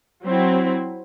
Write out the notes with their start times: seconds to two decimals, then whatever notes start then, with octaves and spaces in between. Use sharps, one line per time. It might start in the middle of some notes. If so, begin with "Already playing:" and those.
0.23 F#3 C4 E4